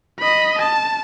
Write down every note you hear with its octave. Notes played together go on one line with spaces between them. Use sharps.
D#5 B5
A5